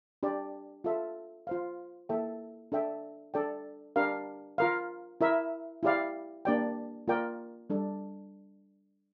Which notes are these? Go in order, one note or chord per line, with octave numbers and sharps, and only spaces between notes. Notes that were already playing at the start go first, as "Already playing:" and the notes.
D4 G4 D5
F4 A4 E5
F4 C5 F5
A#3 E4 A4 E5 G5
D4 A4 E5 G5
D4 A4 D5 G5
D4 G4 A#4 F5
F4 A#4 F5
E4 A#4 E5
E4 G4 D5 F5
A#3 D4 G4 D5 G5
A#3 F4 A#4 D5 G5
G3 D4 A4